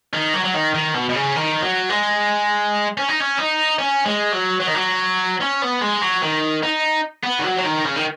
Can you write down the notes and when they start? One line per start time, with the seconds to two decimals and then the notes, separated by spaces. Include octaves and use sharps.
0.14 D#3
0.34 F#3
0.44 F#3
0.54 D#3
0.75 D#3
0.95 B2
1.09 B2
1.15 C#3
1.36 D#3
1.62 F#3
1.90 G#3
2.98 C#4
3.09 D#4
3.20 C#4
3.38 D#4
3.79 C#4
4.06 G#3
4.33 F#3
4.60 F#3
4.67 D#3
4.75 F#3
5.41 C#4
5.62 B3
5.81 G#3
6.02 F#3
6.22 D#3
6.63 D#4
7.23 B3
7.39 D#3
7.44 F#3
7.58 F#3
7.64 D#3
7.85 C#3
7.96 D#3